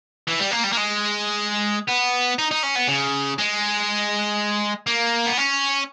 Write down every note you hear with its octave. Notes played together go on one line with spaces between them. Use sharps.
E3
G3
A#3
G3
A#3
G#3
B3
D#4
D#4
C#4
B3
C#3
G#3
A#3
B3
C#4